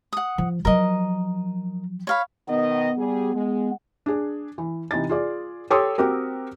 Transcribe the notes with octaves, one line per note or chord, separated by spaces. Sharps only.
F#5 D#6
F3
F3 F#3 A#4 D#5
C#5 F5 B5
B2 D#3 B3 D#5
G3 G#4
G#3
D4 G#4
E3
C3 E3 D#4 A6
F4 G#4 D5
G4 A4 C#5 C6 D#6 E6
C4 F#4 G4 A#4